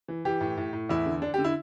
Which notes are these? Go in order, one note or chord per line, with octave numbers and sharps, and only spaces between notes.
E3
E3 G4
A2
A2
A2
E2 E4
D3
D3 D4
G4
D3
E4